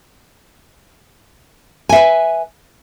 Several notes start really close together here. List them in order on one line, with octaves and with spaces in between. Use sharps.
G#5 E5 B4